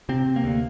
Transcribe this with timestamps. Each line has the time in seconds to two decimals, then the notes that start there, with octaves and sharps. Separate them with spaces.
0.09 C3 C4
0.26 C3
0.36 A#3
0.44 D2